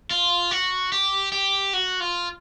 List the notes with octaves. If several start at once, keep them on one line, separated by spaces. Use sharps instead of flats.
F4
F#4
G4
G4
F#4
F4